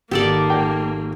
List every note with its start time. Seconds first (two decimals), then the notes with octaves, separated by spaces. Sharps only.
0.11 G#1 A#3 G4 A4 D5 C#7
0.50 G5